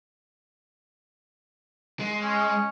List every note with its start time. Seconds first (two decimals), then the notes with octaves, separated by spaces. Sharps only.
1.99 G#3
2.22 C#4